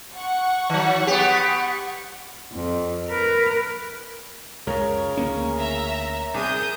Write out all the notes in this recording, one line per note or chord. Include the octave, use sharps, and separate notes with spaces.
F#5 C#6
D#3 F#3
B3 G4
F2
A#4 B4
C#2 F#2 C#3 A#4 C#5
D2 A#3 C#4
E5 A#5
C2 G#4 A#4 D#6 G6